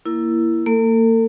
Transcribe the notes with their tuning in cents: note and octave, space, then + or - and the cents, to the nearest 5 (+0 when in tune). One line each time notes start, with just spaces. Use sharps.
A#3 +0 E4 +10 A#4 +0
A#3 -40 A4 +40